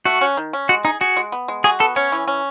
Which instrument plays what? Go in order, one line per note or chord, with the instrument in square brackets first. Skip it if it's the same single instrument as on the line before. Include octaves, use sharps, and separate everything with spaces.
[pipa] A3 [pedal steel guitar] F#4
[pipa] C#4
D#3
C#4
[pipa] G#3 [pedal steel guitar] F#4
[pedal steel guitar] D#4 [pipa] G#4
[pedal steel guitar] F#4 [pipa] G#4
[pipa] G#3
B3
G#3
[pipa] F#4 [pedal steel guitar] G#4
[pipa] B3 [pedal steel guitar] A4
[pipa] C#4 [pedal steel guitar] C#5
[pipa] E3
C#4